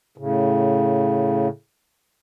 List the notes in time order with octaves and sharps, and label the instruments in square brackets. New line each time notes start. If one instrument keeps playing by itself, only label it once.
[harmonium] A2 C#3